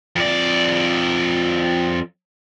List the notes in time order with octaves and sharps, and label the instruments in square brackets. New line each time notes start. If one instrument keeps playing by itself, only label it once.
[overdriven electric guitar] F2 D5